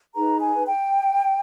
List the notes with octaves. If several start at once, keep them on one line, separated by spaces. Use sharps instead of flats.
D#4 G#4 B4 A#5
G#5
G5